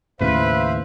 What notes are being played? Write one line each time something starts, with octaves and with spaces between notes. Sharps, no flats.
D#2 A2 C#3 B4 C5 E5 F5